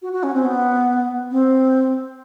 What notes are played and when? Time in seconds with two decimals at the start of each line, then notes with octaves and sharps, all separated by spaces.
0.02 F#4
0.13 F#4
0.23 C#4
0.34 C4
0.45 B3
1.31 C4